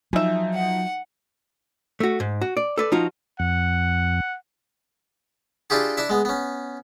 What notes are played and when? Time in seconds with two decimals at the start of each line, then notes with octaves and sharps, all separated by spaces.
0.13 F3 F#3 D#4 G#4 E5
0.54 F#5
2.00 A3 F#4
2.20 G#2
2.41 F#4
2.57 D5
2.77 A4 B4 D5
2.92 F3 D#4 F4 F#4
3.40 F2 F#5
5.70 D4 E4 F4 G4 G#4
5.97 D4 E4 E5
6.09 G#3 B3
6.25 B3 C#4